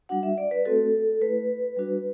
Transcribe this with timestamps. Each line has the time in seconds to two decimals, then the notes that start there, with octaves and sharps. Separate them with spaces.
0.09 G3 D4 F#4 F#5
0.23 E5
0.38 D5
0.51 B4
0.65 A3 C4 F#4 A4
1.22 A3 E4 B4
1.77 G3 D4 F#4